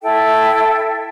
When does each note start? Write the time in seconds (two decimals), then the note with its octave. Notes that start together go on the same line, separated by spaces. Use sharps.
0.02 E4 A4 E5 G5